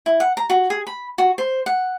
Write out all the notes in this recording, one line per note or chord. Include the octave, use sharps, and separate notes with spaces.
E4
F#5
A#5
F#4
G#4
B5
F#4
C5
F#5